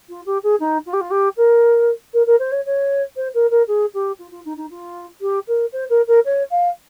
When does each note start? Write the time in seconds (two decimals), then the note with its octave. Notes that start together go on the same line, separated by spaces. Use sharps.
0.09 F4
0.26 G4
0.43 G#4
0.60 D#4
0.86 F4
0.93 G4
1.01 F4
1.11 G4
1.37 A#4
2.14 A#4
2.26 A#4
2.39 C5
2.52 C#5
2.66 C#5
3.16 C5
3.34 A#4
3.50 A#4
3.68 G#4
3.94 G4
4.19 F4
4.31 F4
4.45 D#4
4.57 D#4
4.70 F4
5.21 G4
5.48 A#4
5.73 C5
5.90 A#4
6.07 A#4
6.25 C#5
6.51 F5